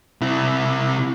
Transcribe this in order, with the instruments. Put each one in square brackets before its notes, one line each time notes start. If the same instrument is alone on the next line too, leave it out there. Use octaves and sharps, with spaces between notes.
[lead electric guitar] C3 E4